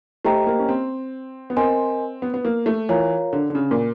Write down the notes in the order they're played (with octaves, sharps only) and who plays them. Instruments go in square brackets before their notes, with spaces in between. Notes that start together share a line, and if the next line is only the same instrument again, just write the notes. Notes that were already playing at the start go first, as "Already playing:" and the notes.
[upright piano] A3 [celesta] G4 C5 D#5 G5 A#5
[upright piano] A#3
C#4
C4
B3
[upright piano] C4 [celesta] A#4 D#5 G#5 C6
[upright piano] B3
B3
A#3
A3
[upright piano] E3 [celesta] F4 A#4 C#5 F5 A#5
[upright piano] D3
D3
C#3
A#2